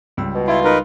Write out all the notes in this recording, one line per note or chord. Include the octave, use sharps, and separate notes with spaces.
C#2 G3 E6
B2
E4 F4
D#4 A#4 B4